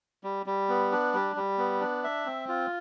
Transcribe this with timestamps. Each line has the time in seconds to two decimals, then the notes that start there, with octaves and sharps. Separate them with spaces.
0.23 G3
0.46 G3
0.69 B3
0.92 D4
1.14 G3
1.36 G3
1.58 B3
1.80 D4
2.04 E5
2.25 C4
2.48 F4